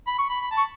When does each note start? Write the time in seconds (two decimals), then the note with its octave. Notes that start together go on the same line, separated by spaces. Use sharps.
0.07 B5
0.19 C#6
0.30 B5
0.41 B5
0.52 A5
0.57 C#6